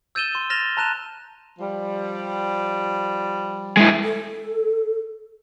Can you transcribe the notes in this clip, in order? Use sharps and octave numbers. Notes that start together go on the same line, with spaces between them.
E6 G6 A6 D#7 E7 G7
C6
F6 A6 A#6 E7 F7 G7
A5 A#5 F#6 D#7 E7
F3 G3
G#3 E4
A4